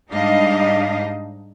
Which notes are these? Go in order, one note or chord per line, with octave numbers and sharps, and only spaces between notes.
G#2 G3 D4 D#4 D#5 F5